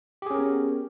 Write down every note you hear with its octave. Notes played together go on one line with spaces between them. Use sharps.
B3 C#4 G4 G#4 A#4